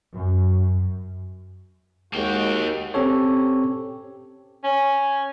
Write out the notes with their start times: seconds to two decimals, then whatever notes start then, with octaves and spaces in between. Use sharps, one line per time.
0.16 F#2
2.14 D#2 G#3 A#3 F#4 G5
2.94 C4 C#4 G4 A4 C#5
4.64 C#4